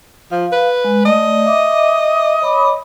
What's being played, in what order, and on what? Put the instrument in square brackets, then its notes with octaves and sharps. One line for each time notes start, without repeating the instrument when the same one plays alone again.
[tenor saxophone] F3 [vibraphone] F5
[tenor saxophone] B4
[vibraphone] G#3
[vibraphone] A3 D5 [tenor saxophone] D#5
[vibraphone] E5 D6
C#5 B5 D6